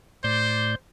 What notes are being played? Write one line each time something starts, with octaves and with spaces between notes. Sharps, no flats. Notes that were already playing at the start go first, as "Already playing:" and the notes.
A2 C5 D5 G6